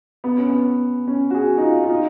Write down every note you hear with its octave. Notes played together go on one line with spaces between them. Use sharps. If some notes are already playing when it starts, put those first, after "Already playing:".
B3
C#4
B3
C#4
F#4
G#4
D#4
F4
F4
D#4